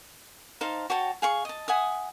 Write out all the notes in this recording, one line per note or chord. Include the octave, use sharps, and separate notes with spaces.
D#4 C5 F5 A5
F#4 C#5 G5 A5
G#4 F5 C#6
D#5 A5
E5 F#5 G#5 D#6